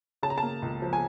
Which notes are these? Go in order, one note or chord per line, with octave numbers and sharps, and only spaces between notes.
C#3 A5
A#5
A5
A#3
C#2
F3
G#5